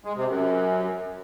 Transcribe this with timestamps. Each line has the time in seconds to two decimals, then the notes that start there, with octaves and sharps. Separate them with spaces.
0.04 G#3
0.16 C3
0.27 F#2